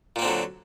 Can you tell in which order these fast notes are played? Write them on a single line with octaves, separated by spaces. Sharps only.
A#2 A#3 C4 D3 F#3